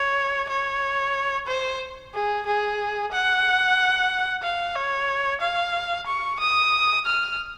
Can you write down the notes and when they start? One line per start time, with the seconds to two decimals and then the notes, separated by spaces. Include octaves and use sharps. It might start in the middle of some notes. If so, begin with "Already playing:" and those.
Already playing: C#5
0.49 C#5
1.48 C5
2.14 G#4
2.47 G#4
3.13 F#5
4.43 F5
4.75 C#5
5.41 F5
6.07 C#6
6.40 D#6
7.06 F6